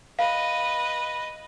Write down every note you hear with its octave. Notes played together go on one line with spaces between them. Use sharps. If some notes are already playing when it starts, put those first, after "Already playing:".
B4 D#5 F5